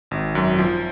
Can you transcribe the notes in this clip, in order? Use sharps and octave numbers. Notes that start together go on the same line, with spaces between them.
G#1
F#2
F3